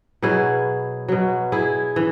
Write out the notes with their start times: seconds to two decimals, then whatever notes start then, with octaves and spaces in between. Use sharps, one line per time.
0.22 B2 F#3 E4 G#4
1.08 B2 F#3
1.52 E4 G#4
1.96 E3